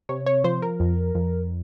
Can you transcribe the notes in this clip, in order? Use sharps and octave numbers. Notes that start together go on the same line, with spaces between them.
C3 C#5
C#5
F3 C5
A#4
F2
F2